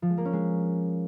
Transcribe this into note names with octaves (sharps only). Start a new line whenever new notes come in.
F3
G#3
A#3
C#4
G#3